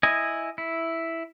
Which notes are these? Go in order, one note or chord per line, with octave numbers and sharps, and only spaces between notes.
E4 D#5 G#5
E4